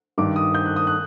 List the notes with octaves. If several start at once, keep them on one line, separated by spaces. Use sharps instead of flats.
G2 D#3 D6
D#6
G6
F#6
D#6
F#6